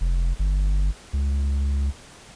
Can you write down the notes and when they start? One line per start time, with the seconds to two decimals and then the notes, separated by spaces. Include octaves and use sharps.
0.01 F1
0.39 G1
1.13 C#2